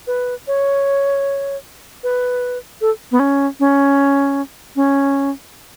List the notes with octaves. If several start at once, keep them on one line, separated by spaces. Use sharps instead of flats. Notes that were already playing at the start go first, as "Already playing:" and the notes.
B4
C#5
B4
A4
B3
C#4
C#4
C#4